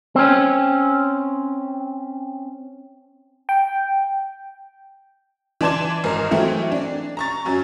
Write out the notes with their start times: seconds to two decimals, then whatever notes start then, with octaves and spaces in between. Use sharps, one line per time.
0.16 C4 C#4
3.49 G5
5.61 E3 D5 A5 C6 G#6 E7
6.04 G#1 A#4 A#5
6.31 E3 F#3 A3 C4 E4
6.72 D4
7.17 A#5 C#6 A6
7.45 F#2 F#3 C#4